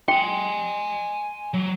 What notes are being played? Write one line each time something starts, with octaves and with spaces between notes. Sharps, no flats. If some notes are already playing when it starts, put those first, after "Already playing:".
G5 G#5 C6
F#3